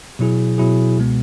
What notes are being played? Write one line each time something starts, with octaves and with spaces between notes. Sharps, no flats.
B2 F#3 E4 G#4
B2 F#3 E4 G#4
C#2 B2 G#3 B3